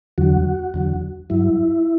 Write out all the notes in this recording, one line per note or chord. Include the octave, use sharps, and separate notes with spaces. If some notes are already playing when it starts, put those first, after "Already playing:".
E2 D3 F#3 F#4
E2 D3 F#3
G2 F#3 E4